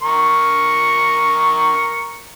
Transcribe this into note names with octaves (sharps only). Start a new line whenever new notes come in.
A#4 C#6